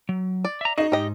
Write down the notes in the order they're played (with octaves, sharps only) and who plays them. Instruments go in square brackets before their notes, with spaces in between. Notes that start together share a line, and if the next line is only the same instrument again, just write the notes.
[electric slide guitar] F#3
[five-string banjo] D5
[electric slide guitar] E5 A#5
[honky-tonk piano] D#4 [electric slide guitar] F#4 G#4 D#5
[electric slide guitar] G#2 [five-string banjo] G4 D#5